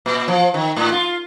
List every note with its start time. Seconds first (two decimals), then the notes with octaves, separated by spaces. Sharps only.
0.06 A#2
0.28 F3
0.54 D#3
0.76 A2
0.92 F4